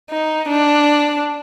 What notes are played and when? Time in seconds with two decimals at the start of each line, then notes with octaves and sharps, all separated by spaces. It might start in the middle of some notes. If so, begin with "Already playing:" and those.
0.11 D#4
0.49 D4